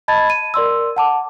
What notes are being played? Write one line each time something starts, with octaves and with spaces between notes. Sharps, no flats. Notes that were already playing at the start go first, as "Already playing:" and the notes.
D#5 A5 B5 G#6 A6
D#7
A#4 D5 C6 E6
F#5 A5 D6